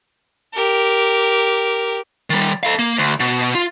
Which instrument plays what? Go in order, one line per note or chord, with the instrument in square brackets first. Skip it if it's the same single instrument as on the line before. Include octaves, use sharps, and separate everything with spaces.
[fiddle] G4 A#4
[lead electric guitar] D#3 G3
A4 F5
A#3
D2
B2
F4